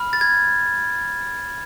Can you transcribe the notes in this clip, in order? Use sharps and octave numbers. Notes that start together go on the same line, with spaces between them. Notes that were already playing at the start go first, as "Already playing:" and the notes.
Already playing: B5 F6
A6
G#6